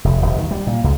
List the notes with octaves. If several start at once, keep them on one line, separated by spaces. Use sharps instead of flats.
F1
D#1
D#3
G3
A#2
C#2